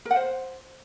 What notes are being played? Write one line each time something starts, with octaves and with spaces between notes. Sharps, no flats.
A#4
F#5
C5